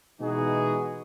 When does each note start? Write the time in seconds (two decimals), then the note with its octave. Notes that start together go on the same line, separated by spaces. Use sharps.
0.21 B2 E3 G#3 D#4 F#4 G#4